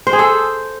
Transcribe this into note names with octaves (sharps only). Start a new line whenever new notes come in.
C5
G#4
A4